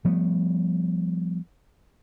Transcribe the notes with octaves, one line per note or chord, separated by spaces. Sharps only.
F3 G3 A3 B3